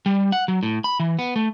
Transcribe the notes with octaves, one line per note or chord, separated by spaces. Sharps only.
G3
F#5
F#3
A2
B5
E3
B3
A3